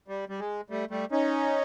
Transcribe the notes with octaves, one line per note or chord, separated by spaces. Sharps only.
G3
G3
G#3
G3 A3
G3 A3
C#4 D#4